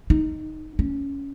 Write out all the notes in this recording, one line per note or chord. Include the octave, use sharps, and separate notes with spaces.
D#4
C#4